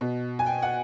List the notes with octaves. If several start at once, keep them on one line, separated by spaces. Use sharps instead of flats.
B2
G#5
G5
F#5